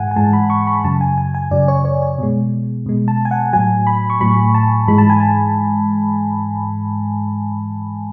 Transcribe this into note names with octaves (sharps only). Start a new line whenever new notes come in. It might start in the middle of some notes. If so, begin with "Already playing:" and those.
Already playing: G#2 E3 G#3 F#5 G#5
G#5
G#2 E3 G#3 A5
B5
C#6
B5
F#2 C#3 F#3 A5
G#5
G#5
G#5
F#2 C#3 F#3 D5
C#5
C#5
C#5
B2 G#3
B2 G#3
A5
G#5
F#5
A2 F#3 G#5
B5
C#6
A2 F#3 B5
A5
G#2 E3 G#3 B5
A5
G#5
A5